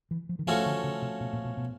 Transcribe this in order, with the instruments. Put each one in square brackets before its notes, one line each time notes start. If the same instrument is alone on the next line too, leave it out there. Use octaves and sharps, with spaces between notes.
[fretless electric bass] E3
F3
D#3
[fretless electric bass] E3 [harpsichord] F3 A3 C#4 F#4 A4
[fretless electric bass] D3
C#3
C3
B2
A#2
B2
B2